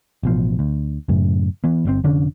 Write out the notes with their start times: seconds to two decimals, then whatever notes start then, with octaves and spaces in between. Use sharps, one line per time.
0.23 A1 B2 F3
0.59 D2
1.09 F#2 A2 C#3
1.64 E3 B3
1.85 G1 C3 C4
2.04 F1 D3 C#4 D4